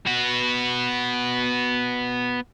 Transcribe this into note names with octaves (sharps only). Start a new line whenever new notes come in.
B3 F#4